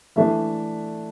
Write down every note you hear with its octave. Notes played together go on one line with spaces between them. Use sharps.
E3 A3 D4 E5